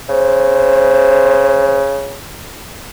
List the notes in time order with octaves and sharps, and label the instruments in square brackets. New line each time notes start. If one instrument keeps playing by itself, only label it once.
[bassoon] C#3 [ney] C5